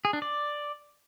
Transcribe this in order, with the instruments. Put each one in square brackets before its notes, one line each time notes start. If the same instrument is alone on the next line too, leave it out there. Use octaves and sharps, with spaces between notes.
[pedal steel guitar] G#4
D4
D5